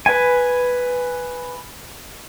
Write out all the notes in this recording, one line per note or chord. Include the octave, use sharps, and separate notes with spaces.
B4 G#5